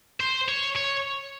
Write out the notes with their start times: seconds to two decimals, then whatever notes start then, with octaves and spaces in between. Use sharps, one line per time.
0.20 C5
0.48 C#5
0.76 C#5